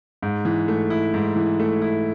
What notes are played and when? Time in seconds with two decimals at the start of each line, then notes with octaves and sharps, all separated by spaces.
0.23 G#2
0.45 E3
0.68 A3
0.90 E4
1.14 G#2
1.36 E3
1.60 A3
1.82 E4